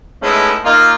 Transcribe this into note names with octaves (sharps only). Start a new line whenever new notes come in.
G#3 A3 B3 C#4 D#4 E4
A#3 D#4 F4